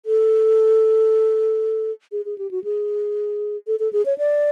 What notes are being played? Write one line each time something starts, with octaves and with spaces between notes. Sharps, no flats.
A4
G#4
G#4
G4
F#4
G#4
A4
A4
G#4
C#5
D5